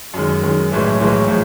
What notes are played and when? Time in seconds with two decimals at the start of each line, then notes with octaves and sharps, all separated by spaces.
0.14 F#2 D#3 G#3
0.43 F#2 D#3 G#3
0.71 B1 A2 E3 G#3
0.99 B1 A2 E3 G#3
1.28 A2 F3 G#3